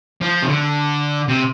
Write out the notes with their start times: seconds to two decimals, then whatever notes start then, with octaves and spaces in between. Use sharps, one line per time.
0.21 F3
0.42 C3
0.48 D3
1.28 C3